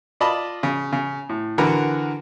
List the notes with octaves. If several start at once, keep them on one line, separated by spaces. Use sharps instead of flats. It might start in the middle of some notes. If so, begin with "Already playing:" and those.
F4 D5 D#5 A5 B5
C#3
C#3
A2
D3 E3 F#4 A#4 B4